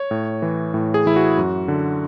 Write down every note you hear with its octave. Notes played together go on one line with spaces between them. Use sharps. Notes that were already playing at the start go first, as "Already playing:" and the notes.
Already playing: C#5
A2
E3
A2
G#4
E3 E4
F#4
F#2
D3